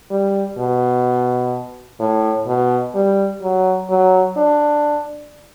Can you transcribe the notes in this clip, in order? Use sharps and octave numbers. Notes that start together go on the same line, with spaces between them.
G3
B2
A2
B2
G3
F#3
F#3
D4